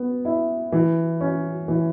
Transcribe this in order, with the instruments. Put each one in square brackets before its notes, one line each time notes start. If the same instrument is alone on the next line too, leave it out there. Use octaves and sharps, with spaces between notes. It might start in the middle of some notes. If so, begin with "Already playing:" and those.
Already playing: [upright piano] B3
E4
E3
C#4
E3